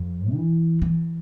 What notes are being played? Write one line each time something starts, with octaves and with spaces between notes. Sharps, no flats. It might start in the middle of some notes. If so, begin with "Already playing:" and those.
Already playing: F2
E3
E3